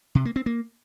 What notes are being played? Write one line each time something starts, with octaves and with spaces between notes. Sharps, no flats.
C3
A#3
C4
A#3